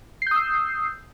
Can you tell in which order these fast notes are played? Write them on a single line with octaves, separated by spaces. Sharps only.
C7 G6 D#6 E6